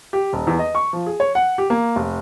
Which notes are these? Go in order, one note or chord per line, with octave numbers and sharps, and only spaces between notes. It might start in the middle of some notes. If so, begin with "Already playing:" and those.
G4
D#1
E2
D#5
C#6
F3
G#4
C#5
F#5
G4
A#3
F1